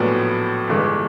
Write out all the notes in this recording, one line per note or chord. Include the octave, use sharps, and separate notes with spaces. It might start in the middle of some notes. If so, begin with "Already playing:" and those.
Already playing: A#1 A2 F#3 B3
G1 G2 E3 G#3